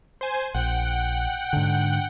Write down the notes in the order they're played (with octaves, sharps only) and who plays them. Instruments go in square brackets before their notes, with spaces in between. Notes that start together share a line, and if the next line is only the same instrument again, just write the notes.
[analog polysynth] C5 G#5
[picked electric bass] A#1 [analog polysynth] F#5 G5 F#6
[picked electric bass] G#2 D3